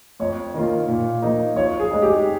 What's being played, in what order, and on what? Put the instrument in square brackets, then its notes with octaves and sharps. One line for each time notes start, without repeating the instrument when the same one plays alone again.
[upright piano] F2 [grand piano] C#5
[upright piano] D#3 A#3 F4
A#2
F3 A#3 D#4
[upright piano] F3 [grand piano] C#5
[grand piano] G#4
[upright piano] G#3 D#4
[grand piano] G4